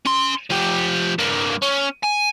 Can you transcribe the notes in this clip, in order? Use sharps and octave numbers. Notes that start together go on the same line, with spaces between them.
C#4 C6
F3 G4
G2 A#3
C#4
G#5